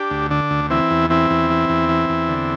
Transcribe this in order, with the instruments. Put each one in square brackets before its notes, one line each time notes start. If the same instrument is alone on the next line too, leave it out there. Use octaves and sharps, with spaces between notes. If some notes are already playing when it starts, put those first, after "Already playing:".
Already playing: [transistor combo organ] D4 G4
D2
D3 D4
D2
E3 C4 E4
E2
E3 C4 E4
E2
E3
E2
E3
E2
D3